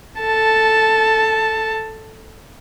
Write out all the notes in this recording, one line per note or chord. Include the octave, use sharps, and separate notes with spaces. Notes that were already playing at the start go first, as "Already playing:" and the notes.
A4 A5